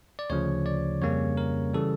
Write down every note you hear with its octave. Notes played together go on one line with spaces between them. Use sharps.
D5
D2 C#3 F3 C#5
D5
F2 C#3 G3 A#3 C#4 C#5
A#4
C#3 E3 G3 A4